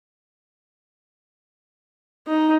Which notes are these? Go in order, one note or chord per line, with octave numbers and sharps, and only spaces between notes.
D#4